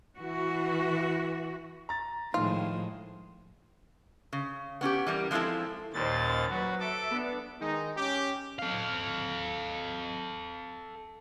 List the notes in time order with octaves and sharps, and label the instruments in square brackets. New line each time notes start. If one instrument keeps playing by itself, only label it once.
[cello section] E3 F#4
[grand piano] A#5 A6
[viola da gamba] A2 F3 G#3 [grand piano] D#3 [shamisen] F4
[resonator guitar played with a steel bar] C#3
B3 C#4 F4 G4
E3 G3 A#4
F3 G#3 C4 E4 A4
[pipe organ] D#2 A#2 A6 [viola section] C#4 C5 D#5
[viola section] F#3 B4 [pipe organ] F#4
[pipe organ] A4 D6 [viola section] E5
[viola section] B3 D4
[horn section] D#3 G#3 D#4
C#4 G4
[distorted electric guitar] A4 F5